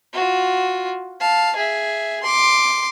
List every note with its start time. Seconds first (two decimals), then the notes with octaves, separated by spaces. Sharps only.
0.13 F4 F#4
1.20 F5 A5
1.56 G#4 E5
2.23 C6 D6